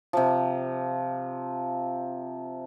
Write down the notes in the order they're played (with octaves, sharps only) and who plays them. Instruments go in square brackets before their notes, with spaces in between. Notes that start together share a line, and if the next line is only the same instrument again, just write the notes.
[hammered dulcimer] C3 F3